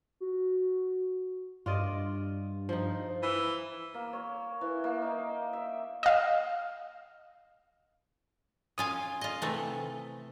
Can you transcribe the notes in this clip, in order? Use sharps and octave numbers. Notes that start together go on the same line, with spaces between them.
F#4
G2 F4 D5 D#5
F3 D#4
E3
A#3
C#5
E3
A#3
D#4
E5
D#5 F5
C#4 F4 F5 G#5 D#6
F4 D#5
C3 E3 A3